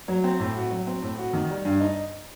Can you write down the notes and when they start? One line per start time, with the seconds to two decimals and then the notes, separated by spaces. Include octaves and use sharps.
0.08 F#3
0.24 C4
0.40 A2
0.56 F#4
0.71 F#3
0.87 C4
1.02 A2
1.18 F#4
1.33 D#3
1.50 G3
1.65 G2
1.80 D#4